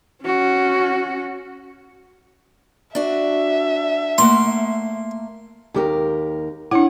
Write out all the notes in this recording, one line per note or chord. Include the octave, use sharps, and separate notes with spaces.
C#4 F#4
D4 F#4 E5
A3 A#3 F#5 C6
D#2 G4 A#4
D4 E4 C#5 F#5